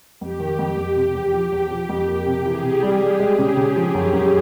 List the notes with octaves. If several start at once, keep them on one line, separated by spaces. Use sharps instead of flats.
F2 G4
D#3
F2
F2
C3
E2
F3
E2
F3
F2
A#3
C3
E3 G#4
C3
G3
G3
G#3
C#3
C#3
F3
F#2
F#2